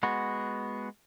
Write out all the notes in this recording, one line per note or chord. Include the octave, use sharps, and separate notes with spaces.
G#3 B3 F#4